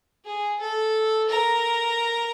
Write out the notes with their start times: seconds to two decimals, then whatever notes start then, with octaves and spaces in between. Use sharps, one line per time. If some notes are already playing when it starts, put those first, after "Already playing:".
0.25 G#4
0.60 A4
1.29 A#4